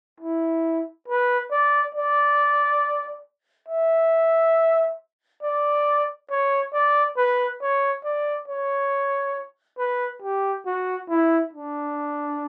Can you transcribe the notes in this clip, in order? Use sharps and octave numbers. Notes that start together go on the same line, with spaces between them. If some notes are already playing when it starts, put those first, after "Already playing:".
E4
B4
D5
D5
E5
D5
C#5
D5
B4
C#5
D5
C#5
B4
G4
F#4
E4
D4